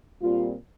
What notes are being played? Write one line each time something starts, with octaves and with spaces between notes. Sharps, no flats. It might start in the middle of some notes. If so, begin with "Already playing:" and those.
A#2 G3 C4 F4